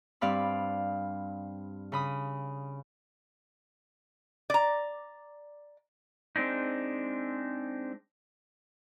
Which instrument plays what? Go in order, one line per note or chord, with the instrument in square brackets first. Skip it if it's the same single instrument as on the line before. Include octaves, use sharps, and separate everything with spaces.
[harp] G2 C4 D5 F5 B5
C#3 B5 D#6
[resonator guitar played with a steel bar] D5 A#5
[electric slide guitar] G#3 C4 D4 D#4